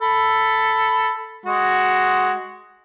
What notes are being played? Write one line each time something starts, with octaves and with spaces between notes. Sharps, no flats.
A4 B5
G#3 F#4